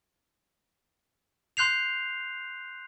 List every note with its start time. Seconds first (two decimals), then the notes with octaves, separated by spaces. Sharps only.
1.57 C6 F#6 G6 C7 F7